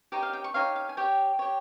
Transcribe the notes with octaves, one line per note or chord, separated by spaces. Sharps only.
D#4 G4 C#5 G5
F5
G5
C#6
D#4 G4 C#5 F5
F5
G#5
G4 C#5 G5
G4 C#5